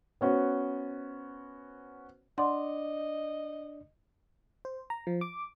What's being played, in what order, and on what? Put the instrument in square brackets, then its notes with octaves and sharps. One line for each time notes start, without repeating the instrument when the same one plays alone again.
[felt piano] B3 C#4 F#4 C5
[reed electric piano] D4 D5 [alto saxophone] D#5 [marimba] F#5 C6
[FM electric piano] C5
A#5
F3
D6